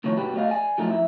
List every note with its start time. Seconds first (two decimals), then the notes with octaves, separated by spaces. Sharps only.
0.04 C#2 A2 D#3 F3 A3 C#5
0.17 G2 B2 G3 F#4 G4 B4
0.34 A3 F#4 C#5 D#5 F5
0.48 G#4 D5 G5 G#5
0.78 F3 F#3 A3 D#4 E4 A#4
0.90 F2 E4 E5